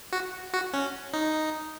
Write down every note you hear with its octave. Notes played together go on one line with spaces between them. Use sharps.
F#4
F#4
C#4
D#4